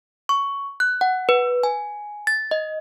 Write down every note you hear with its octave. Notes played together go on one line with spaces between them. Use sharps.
C#6
F#6
F#5
B4
G#5
A6
D#5